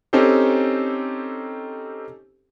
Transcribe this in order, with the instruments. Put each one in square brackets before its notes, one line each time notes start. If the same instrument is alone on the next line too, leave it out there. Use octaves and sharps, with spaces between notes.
[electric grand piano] C4 C#4 D#4 G4 A4 C5